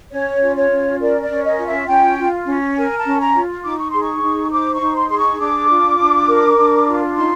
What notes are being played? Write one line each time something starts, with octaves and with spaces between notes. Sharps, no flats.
C#4 C#5
F4
C#5
C#4
A#4 D5
D5
C#4
D#5
F4
E5
C#4 G5
F4
C#4
A#4 G#5
A5
C#4
A#5
F4
D#4 D6
C#6
G#4 C6
C#6
D#4
C5 D6
C#6
D#4
C6
G#4 C6
C#6
D4 D6
F4
D4
A#4
D4
F4
D#4 C6